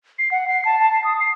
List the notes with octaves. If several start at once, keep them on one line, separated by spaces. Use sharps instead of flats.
C7
F#5
C7
A5
A5
C7
D#6
C7